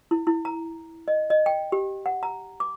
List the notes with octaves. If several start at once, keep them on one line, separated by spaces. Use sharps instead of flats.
E4
E4
A#5
D#5
D#5
G5
G4
F#5
A#5
D6